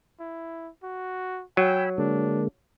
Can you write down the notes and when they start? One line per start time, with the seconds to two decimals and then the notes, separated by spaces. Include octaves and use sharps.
0.20 E4
0.83 F#4
1.57 F#3 G5 G#5 B5 E6
1.98 D3 G#3 A#3 D4